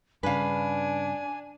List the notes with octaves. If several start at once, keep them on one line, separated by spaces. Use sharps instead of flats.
G2 C#3 D4 B4 F5 G#5